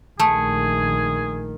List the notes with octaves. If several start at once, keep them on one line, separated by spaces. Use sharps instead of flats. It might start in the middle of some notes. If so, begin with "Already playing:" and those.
A#1 D#3 A3 G#4